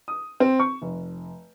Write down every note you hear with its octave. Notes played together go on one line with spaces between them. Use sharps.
D#6
C4
C#6
F1